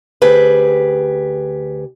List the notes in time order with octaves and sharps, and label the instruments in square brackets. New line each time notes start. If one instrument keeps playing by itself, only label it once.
[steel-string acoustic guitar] D2 G4 G#4 B4